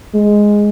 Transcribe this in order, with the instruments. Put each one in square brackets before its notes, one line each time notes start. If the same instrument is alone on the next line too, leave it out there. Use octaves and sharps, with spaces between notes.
[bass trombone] G#3